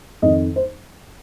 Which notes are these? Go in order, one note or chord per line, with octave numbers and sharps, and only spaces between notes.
F2 D#3 D#5
C5